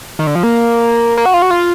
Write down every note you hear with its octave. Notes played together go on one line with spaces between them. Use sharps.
D#3
D3
F3
A#3
A#3
F#4
F4
F#4
F4